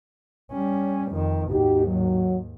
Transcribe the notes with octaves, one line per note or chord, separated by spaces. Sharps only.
G3 C#4
F2 D#3
D#2 G#2 D#4 F#4 G4
F#3